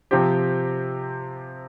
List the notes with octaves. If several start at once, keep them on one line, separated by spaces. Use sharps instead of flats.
C3 F3 C4 G4